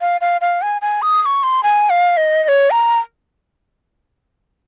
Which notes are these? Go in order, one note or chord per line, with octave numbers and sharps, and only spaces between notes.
F5
F5
F5
G#5
G#5
D#6
D#6
C#6
C6
G#5
F5
D#5
D#5
C#5
A#5